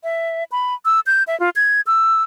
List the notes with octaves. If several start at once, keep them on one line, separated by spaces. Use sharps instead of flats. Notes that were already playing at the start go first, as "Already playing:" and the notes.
E5
B5
E6
G6
E5
F4
G#6
E6